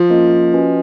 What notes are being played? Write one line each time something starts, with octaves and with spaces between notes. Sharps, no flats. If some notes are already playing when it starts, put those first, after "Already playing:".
Already playing: F3
A#3 C#4 F4 A#4 D#5
C#4 F#4 B4 D#5 G#5